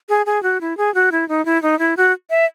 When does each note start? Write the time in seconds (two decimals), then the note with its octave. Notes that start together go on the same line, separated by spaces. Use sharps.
0.09 G#4
0.26 G#4
0.43 F#4
0.61 E4
0.77 G#4
0.94 F#4
1.12 E4
1.29 D#4
1.45 E4
1.62 D#4
1.79 E4
1.97 F#4
2.30 E5